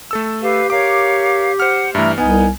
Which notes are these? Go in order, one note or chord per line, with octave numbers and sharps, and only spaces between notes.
A3 A4 E6
G4 B4 F5
A#4 C#5 F5 D6
C5 F#5 F6
G2 E3 A3 E5 A#5 F6
C2 B3 D#4 G#5